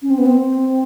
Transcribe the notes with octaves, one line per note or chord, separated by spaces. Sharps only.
C#4
C4
B3
C4